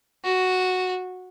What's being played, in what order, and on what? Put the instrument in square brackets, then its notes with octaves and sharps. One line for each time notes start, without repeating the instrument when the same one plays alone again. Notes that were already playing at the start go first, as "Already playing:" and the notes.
[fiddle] F#4